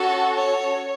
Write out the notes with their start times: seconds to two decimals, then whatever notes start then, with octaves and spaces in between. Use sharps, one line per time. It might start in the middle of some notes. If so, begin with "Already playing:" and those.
Already playing: C#4 F#4 A4
0.36 C#5